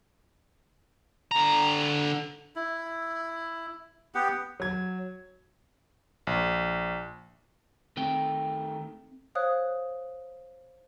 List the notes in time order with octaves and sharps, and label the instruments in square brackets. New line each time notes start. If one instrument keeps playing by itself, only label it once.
[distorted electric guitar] D3 A#5
[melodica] E4
B3 G4 F#5
[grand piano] F#3 G#6
[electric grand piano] A#1
[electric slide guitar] D#3 A3 G5 [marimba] C4
[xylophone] C5 C#5 F5 D#6 F#6